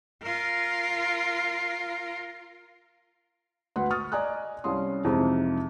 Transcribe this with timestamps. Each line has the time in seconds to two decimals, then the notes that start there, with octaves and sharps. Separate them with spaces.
0.23 F4 A#4
3.76 D2 B4 F#5 C6
3.90 C#6 D#6 F6 A6
4.12 D5 D#5 G#5 A#5 D#6 F#6
4.64 C2 G3 C#4 F5 C6 D#6
5.05 F2 C3 E3 G#3 D#4